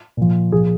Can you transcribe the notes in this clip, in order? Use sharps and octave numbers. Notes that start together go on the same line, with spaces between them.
A#2 F3
A#2 F3 G#4